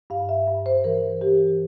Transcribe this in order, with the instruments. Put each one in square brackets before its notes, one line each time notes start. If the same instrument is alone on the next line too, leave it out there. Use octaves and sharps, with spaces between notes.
[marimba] G2 F5
E5
G2
C5
E3 A#4
E3 G4